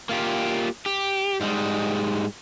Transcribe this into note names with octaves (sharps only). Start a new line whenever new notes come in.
A#3 F4 G4
G4
G#2 G3 G#3